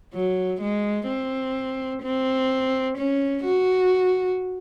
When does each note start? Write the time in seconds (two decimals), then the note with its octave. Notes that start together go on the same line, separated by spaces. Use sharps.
0.14 F#3
0.61 G#3
1.08 C4
2.03 C4
2.97 C#4
3.44 F#4